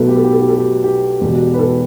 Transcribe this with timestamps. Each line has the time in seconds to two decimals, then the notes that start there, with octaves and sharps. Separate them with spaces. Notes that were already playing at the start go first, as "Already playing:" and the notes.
Already playing: B1 B2 F#3 A3 A4 B4
0.09 G4
0.16 A4
0.24 G4
0.32 A4
0.41 G4
0.49 A4
0.57 G4
0.84 G4
1.21 E1 E2 B2
1.54 B4
1.59 A4